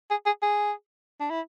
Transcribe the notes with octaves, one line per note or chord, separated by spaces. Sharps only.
G#4
G#4
G#4
D4
E4